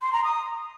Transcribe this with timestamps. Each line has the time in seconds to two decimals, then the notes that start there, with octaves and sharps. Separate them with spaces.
0.01 C6
0.12 A#5
0.24 D#6